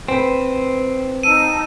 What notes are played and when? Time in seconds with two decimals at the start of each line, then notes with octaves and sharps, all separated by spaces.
0.09 C4 B4 G5
1.23 D#4 A5 E6 D#7